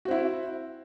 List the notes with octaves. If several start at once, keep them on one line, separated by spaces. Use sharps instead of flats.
C4 E4 F#4